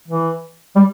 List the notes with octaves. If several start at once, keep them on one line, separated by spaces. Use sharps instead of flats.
E3
G3